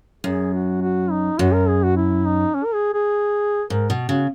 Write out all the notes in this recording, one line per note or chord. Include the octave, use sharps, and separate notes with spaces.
F#2 G#4
F#4
F#4
D#4
F#2 F#4
A#4
G#4
F#4
E4
D#4
C#4
A#4
G#4
G#4
G#2 A#4
B2
C#3 F#4